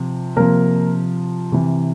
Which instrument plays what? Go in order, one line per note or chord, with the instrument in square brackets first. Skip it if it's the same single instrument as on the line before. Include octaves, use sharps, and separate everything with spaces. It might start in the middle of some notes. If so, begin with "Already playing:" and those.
Already playing: [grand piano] C3 F3
C3 F3 A#3 A#4
C3 E3